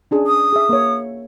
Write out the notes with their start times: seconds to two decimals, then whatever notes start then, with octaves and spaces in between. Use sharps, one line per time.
0.11 C#4 D4 G#4
0.27 D#6
0.53 G#4 E5
0.69 A#3 C#5